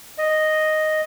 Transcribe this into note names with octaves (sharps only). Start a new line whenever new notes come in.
D#5